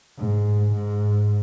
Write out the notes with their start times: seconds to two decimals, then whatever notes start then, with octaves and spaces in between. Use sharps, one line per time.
0.18 G#2
0.74 G#2